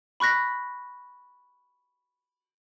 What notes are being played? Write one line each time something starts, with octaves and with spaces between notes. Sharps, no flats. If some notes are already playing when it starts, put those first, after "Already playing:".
B5 C#6 F#6 A#6 B6